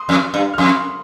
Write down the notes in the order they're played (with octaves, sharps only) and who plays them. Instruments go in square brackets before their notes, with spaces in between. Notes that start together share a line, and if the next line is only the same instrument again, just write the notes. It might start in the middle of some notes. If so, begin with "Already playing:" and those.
Already playing: [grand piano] C6 D#6
[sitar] F2
G2
[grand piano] F6
[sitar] F2 [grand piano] C6 D#6